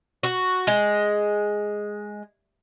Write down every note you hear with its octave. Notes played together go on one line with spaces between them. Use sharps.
F#4
G#3